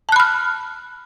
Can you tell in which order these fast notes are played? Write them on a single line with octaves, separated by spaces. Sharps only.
A5 F#6 B5 F6